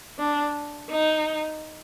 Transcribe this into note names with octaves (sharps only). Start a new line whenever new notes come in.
D4
D#4